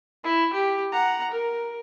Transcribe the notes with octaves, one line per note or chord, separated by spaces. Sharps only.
E4
G4
F#5 A#5
A#4